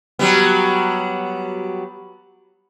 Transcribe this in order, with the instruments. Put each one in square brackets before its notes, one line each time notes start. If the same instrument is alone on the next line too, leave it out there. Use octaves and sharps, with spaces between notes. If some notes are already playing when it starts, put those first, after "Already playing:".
[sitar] F#3 G3 B3